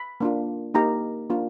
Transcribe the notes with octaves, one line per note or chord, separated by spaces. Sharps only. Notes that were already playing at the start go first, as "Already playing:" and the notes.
Already playing: B5
A#3 D4 F4
A#3 D#4 G4 A#5
A#3 D4 F4